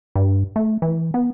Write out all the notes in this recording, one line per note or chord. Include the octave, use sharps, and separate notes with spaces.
G2
A3
E3
B3